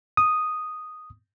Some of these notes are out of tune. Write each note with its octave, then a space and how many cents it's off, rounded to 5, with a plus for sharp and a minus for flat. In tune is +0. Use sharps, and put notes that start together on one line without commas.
D#6 -5